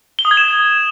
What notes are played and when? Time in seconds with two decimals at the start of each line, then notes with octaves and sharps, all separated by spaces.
0.19 G7
0.25 D#6
0.31 G#6
0.37 E7